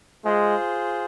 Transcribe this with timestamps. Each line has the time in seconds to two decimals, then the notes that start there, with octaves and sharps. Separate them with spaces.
0.25 G#3 F4 G#4 C5